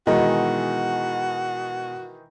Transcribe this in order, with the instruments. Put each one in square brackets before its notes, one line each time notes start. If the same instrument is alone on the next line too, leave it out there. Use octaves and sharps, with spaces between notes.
[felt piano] B2 G#3 [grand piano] D#3 E3 D#4 [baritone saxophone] F#4